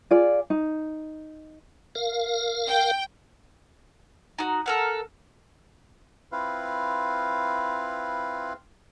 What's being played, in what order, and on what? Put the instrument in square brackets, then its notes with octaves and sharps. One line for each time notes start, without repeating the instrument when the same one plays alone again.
[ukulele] F4 G#4 D5
D#4
[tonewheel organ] A#4 F5
[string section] G5
[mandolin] D#4 F#4
A4 A#4 F#5
[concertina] C4 E4 F4 B4 F5